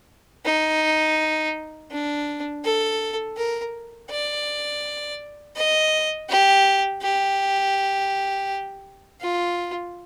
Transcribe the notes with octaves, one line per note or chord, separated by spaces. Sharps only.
D#4
D4
A4
A#4
D5
D#5
G4
G4
F4